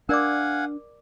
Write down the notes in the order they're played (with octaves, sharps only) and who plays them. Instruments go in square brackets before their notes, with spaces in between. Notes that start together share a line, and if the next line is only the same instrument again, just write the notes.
[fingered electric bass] D4 [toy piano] A#4 D5 D6 [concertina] F5 F#5 G#5